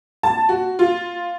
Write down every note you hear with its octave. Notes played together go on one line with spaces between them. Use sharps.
A5
F#4
F4